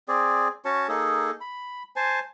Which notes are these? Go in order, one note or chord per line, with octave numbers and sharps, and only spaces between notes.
C4 G#4 D5
C#4 F#4 C#5 A5
A#3 D#4 G#4 A4
B5
C5 G#5 A5